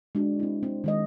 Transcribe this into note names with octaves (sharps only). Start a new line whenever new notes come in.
G#3 D4 F#4
C4 E4
C4
D#3 G#3 D#5